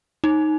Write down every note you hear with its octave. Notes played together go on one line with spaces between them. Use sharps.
D#4